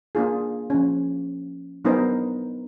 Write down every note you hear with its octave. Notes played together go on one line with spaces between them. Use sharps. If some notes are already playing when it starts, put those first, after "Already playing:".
A#3 D4 F4 G#4
F3 C#4
F#3 B3 D4 D#4 A#4 C5